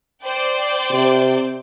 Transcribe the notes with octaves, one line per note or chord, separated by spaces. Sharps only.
C5 D5 G5
C3